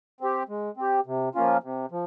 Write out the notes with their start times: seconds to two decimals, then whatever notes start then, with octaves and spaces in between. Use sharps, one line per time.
0.21 C4 G4
0.49 G#3
0.77 C4 G4
1.06 C3
1.35 F3 A#3 C#4 F4
1.63 C3
1.91 F3